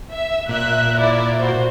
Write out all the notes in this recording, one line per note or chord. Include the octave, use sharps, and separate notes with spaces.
E5
A#2 E5 F#6
E4 D5
F#4 C5